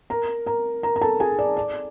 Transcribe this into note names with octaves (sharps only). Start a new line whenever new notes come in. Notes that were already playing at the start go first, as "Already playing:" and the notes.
A#4 A#5
A#4 A#5
A#4 A#5
A#5
A4 A5
G#4 G#5
D5
D5